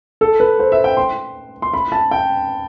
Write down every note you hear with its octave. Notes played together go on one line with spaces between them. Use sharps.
A4
B4
C5
E5
G5
C6
C6
B5
A5
G5